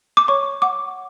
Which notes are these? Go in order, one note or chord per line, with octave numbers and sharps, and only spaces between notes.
D6
C#5 C#6
F#5 D6